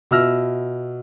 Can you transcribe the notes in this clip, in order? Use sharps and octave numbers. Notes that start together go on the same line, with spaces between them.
B2 F4 E5 E6 F6 A#6